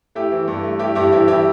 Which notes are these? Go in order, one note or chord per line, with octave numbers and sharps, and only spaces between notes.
A3 E4 G4
E3
G2
A3
A3 E4 G4
G2 E4 G4
E3 E4 G4
E3 E4 G4